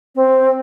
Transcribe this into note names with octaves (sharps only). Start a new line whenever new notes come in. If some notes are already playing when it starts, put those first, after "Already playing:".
C4